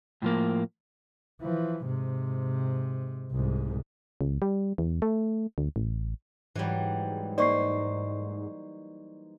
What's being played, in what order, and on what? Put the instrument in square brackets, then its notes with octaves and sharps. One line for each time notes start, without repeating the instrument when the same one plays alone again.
[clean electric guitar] A2 F3 A#3
[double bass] E3 F3
G#2 C3
C2 G#2
[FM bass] C#2
G3
E2
A3
D2
A1
[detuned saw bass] G#2 [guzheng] E3 F#3 G3
[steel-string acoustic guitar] A#3 D#4 C5 [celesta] D5 C#6 C7